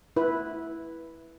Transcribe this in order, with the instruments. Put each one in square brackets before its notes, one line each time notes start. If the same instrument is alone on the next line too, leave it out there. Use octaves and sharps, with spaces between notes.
[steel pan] E4 B4